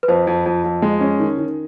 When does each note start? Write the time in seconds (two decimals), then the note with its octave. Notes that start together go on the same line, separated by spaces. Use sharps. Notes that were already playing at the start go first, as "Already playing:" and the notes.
0.03 B4
0.08 F2 C5
0.27 F2
0.46 F2
0.64 F2
0.82 G#3
1.01 C#4
1.20 D#3
1.38 D#3